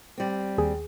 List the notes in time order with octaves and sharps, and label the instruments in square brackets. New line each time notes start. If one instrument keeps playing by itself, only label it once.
[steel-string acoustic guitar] G3 C4
[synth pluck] D#2 G#4